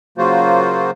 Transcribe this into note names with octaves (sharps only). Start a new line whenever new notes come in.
C#3 F#3 A#3 F4 F#4 C5